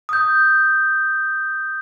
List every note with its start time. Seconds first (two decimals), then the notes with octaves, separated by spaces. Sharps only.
0.09 D#6 G6